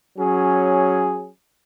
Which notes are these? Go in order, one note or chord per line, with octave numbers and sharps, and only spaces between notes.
F#3 C#4 G#4